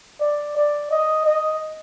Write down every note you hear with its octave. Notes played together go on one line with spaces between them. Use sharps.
D5
D5
D#5
D#5